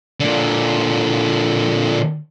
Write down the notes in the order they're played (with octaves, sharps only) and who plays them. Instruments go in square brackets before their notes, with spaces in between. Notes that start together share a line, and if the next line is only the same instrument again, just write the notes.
[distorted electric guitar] A#2 D3